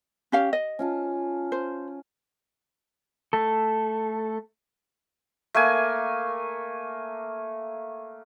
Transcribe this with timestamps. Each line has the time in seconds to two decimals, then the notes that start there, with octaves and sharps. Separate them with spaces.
0.32 C#4 G4 F5
0.53 D#5
0.79 C#4 F4 A5
1.52 C5
3.33 A3 A4
5.54 A3 A#3 G#5